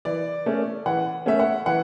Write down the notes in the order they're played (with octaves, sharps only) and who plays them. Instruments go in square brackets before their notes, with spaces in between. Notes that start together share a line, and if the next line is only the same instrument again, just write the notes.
[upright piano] E3 D5
A3 C#4
E3 F#5
A3 C#4 E5
F#5
E3 F#5